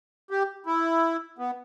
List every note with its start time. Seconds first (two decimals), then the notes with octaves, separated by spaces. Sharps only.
0.31 G4
0.66 E4
1.38 B3